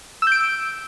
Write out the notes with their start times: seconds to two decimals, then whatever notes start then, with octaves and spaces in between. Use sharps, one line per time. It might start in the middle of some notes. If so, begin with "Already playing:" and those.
0.22 E6
0.27 G6
0.32 D7